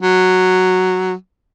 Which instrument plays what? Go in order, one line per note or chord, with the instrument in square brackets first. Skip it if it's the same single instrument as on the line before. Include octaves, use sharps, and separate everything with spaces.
[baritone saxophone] F#3